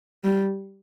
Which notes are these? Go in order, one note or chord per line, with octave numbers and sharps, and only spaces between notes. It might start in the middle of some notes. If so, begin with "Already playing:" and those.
G3